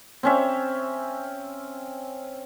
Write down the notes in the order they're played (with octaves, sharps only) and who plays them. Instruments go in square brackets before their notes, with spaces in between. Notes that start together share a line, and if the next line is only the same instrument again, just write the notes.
[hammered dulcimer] C4 C#4 E5